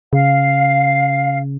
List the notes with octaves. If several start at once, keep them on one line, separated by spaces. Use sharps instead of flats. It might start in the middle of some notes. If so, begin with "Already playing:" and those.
C#3 F5